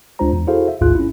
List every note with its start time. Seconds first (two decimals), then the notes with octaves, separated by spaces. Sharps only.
0.19 D2 G#3 D4 F4 C5 A#5
0.33 E2
0.47 E4 F#4 G#4 A4 C5 F5
0.68 E5
0.81 A1 D2 G#2 F4 G#4 F#6
0.95 C#4 E4